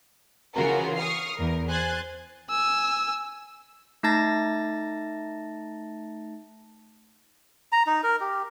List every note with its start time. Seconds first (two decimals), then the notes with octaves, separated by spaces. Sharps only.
0.55 C#3 E3 C#4 F4 F#4 A#4
0.97 C#6 D#6 F6 C7
1.38 E2 A#4
1.69 C5 G#5 F#6 G#6 A6
2.50 G#5 E6
4.03 A3 D#4 A5 A6 A#6
7.72 A#5
7.86 D#4
8.03 A#4
8.21 G4